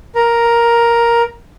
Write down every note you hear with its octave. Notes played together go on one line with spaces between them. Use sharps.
A#4